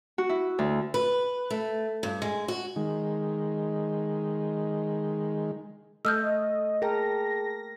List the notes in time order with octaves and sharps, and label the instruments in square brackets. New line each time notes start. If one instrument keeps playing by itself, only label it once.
[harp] F#4
E4
D2
[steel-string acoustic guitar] B4
A3
G2
G#3
F#4
[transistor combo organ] D#3 G#3
[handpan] A3 A4 [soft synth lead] D#5 [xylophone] E6 F6 G6
[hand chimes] G#4 G5 A5 [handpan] A#4 [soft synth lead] A#6